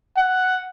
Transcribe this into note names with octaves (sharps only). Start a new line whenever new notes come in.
F#5